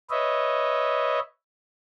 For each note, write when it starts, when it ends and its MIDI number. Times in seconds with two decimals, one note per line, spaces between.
0.10 1.20 71
0.10 1.20 73
0.10 1.20 75
0.10 1.20 76